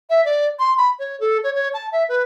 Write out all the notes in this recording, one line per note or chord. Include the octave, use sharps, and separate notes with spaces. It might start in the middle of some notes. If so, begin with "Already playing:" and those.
E5
D5
C6
B5
C#5
A4
C#5
C#5
A5
E5
B4